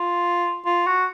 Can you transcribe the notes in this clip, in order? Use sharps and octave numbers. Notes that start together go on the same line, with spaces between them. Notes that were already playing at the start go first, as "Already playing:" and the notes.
Already playing: F4
F4
F#4